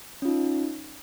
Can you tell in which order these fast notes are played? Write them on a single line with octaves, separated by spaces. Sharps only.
C#4 F4 D#4